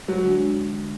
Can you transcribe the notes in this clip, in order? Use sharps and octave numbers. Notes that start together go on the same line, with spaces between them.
F#3
D3 G#3 D4